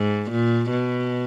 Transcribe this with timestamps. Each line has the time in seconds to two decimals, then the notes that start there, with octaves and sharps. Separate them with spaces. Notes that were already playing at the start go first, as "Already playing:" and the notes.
Already playing: G#2
0.31 A#2
0.70 B2